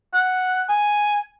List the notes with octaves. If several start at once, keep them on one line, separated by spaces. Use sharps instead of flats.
F#5
G#5